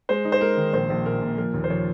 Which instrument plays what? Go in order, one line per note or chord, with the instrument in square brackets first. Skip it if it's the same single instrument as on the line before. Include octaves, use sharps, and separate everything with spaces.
[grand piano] G#3 C5
D#4
C5
G#3 A#4
D#3
A#1 C5
A#1
A#2 A#4
A#2
F3 A#4
D#2
C5
F3 C#5